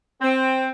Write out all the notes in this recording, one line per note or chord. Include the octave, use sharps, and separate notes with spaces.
C4